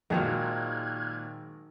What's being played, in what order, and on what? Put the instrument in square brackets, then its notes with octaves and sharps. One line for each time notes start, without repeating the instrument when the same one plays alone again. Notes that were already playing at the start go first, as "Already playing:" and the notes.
[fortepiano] G#1 [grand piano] A#2 [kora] D#3 F#3 D#4 [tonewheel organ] F6 F#6 G#6